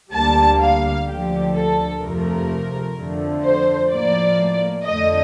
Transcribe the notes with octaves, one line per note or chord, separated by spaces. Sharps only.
D2 D3 G3 A#3 A5
F5
D2 D3 F3 G4
A4
F2 C3 F3 A3 A#4
F2 D3 F3 A3
C5
A2 F3 A#3 D5
F2 D3 A3 D#5